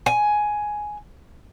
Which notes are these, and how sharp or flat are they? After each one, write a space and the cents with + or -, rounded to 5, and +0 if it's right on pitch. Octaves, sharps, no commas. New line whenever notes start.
G#5 +10